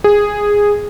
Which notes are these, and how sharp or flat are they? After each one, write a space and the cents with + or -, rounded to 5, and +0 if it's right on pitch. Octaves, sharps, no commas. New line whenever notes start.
G#4 -10